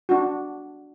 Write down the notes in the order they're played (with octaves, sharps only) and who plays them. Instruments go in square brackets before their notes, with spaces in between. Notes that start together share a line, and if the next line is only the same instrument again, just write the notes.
[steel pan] D4 F#4